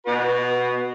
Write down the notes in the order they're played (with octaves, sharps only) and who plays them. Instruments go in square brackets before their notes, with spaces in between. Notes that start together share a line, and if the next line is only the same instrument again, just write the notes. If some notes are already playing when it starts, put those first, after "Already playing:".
[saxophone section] B2 F#4 B4